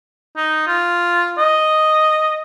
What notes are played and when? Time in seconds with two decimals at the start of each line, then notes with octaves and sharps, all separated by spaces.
0.37 D#4
0.67 F4
1.38 D#5